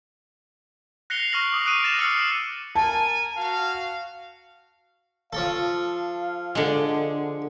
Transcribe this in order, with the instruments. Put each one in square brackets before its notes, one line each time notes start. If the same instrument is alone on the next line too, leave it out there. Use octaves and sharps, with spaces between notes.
[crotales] F#6 A#6 C7 C#7 F7 G7
C#6 F6 A#6 F#7
D6 D#6
C#6 D#6 F#6 D7 D#7
C#6 A6 A#6 D#7 E7
E6 F6 C7 C#7 F#7
[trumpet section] A#4 G#5 [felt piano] A5
[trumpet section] F#4 F5
[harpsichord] F3 A4 [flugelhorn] F5
[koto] D3 G#3